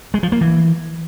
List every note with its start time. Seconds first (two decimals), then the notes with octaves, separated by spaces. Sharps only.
0.14 G#3
0.23 F3
0.32 A#3
0.41 E3